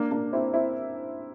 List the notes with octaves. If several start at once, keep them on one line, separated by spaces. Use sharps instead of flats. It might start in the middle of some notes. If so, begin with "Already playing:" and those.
Already playing: A#3 D4
A#3 D4
C4 E4
C4 E4